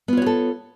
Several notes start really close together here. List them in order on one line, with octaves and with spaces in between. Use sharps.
B3 F4 C#5 F#4 A4